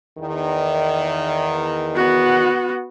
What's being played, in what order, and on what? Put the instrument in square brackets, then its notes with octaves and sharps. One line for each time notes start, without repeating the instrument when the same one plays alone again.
[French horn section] E2 D#3
[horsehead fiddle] B3 F#4